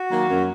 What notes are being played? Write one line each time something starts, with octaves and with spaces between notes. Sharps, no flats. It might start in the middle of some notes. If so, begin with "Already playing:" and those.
Already playing: F#4
D#3 F#3 A#3
F#2